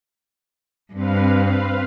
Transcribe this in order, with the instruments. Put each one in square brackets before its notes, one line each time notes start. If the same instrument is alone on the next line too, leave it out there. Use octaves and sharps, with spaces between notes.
[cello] G2 [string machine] C4 B4 F5